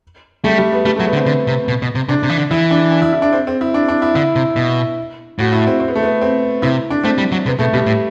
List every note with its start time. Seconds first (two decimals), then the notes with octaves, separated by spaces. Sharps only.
0.44 G3 A3
0.57 G3
0.72 B3
0.85 G3 A3
0.96 A3
1.00 F#3
1.06 B3
1.13 D3
1.17 C4
1.26 D3
1.47 C3
1.68 B2
1.82 B2
1.95 C3
2.09 C3 D4
2.23 C3
2.30 E3
2.37 D3
2.51 E3 E4
2.71 D4
2.92 D4
3.02 E4
3.13 E4
3.22 D4
3.33 C4
3.47 C4
3.61 E4
3.74 D4
3.88 D4
4.02 E4
4.15 D3 E4
4.36 C3
4.56 B2
5.39 A2 F#4
5.52 E4
5.67 C4
5.80 C4
5.88 B3
5.95 A3
6.03 B3
6.21 C4
6.62 C3 E4
6.90 D4
7.03 A3 C4
7.18 G3
7.32 F#3
7.46 C3 B3
7.59 B2 A3
7.73 B2 G3
7.86 A2